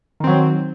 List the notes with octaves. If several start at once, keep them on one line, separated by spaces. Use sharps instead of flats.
D#3 F#3 C4